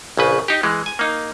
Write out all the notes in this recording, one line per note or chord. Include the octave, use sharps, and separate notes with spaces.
A#1 C#3 B4
D#4 G4
E3 G#3
G#5
A#3 D#4